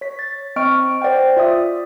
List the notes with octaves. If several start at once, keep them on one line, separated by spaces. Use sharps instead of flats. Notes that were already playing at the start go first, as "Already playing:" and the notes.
C#5 B6
A6
C4 D#5 C#6 F6 D7
C5 D5 F#5 G5
F4 D5 E5 D#6